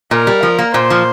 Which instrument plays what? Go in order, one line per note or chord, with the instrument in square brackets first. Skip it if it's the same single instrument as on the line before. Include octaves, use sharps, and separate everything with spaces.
[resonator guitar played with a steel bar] A#2 [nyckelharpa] A#4
[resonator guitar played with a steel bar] G3
F3
A#3
[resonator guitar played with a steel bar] A#2 [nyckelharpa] C5
[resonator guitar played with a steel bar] F3